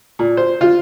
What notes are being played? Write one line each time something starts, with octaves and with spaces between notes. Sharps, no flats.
A#2
C5
F4